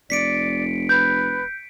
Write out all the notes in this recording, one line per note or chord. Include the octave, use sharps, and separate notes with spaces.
F1 D5 B6 C#7 D7
B4 G6